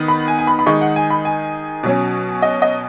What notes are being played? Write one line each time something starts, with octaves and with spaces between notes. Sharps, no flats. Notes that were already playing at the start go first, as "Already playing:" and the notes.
Already playing: D#3 B3 D#4
B5
G#5
G#5
B5
B5
D#3 G#3 D#4 C#6
F#5
G#5
B5
G#5
B2 F#3 C#4
D#5
D#5